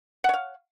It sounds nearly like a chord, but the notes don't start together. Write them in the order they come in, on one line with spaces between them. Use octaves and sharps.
F#5 C#5 F5